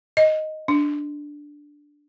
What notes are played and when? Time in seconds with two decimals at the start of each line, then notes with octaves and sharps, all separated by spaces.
0.17 D#5
0.68 D4